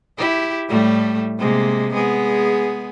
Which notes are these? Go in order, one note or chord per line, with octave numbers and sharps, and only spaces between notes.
E4 G4
A2 G3 A3
C3 G#3 A#3
G#3 B3 G#4